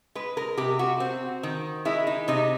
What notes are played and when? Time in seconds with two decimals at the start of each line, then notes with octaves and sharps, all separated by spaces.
0.15 G#3 B4
0.37 A#4
0.57 C3 G4
0.79 F#4
1.00 C4
1.43 D#3
1.85 G#3 E4
2.07 D#4
2.28 C3 D#4